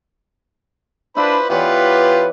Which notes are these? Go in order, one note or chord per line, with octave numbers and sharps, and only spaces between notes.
D4 E4 F4 B4 C5 D5 B5
E3 B3 F4 G4 B4 C#5 D5